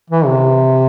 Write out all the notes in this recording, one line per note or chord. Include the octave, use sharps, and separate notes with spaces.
E3
C3